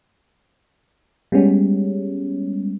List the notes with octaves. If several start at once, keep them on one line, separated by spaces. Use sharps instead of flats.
G3 G#3 B3 C#4